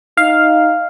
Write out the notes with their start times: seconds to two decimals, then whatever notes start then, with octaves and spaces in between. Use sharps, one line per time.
0.17 D#4 F5